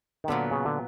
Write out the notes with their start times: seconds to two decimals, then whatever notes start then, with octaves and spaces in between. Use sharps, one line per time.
0.24 D#3
0.28 A#2 D3 F#3 B3
0.51 C#3
0.65 D3